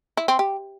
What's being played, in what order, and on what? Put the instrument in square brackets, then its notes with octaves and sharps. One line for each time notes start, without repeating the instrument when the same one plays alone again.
[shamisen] E4
C4
G4